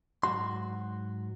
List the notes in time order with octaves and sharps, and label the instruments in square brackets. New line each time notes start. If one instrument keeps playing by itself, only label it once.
[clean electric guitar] G#2 F#3 F#4 C6